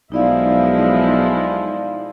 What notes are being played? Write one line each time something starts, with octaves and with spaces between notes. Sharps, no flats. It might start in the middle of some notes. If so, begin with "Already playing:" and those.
B1 F3 G#3 D#4 E4 D5 F5